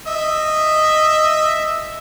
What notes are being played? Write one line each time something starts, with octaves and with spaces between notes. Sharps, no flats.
D#5 E5